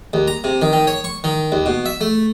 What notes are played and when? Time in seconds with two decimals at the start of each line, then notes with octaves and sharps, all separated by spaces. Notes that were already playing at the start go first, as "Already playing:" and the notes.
0.13 D#2
0.28 A#5
0.44 C3
0.62 D#3
0.73 D#3
0.87 C#5
1.04 C#6
1.24 D#3
1.52 D#2
1.66 B2
1.86 E5
2.01 A3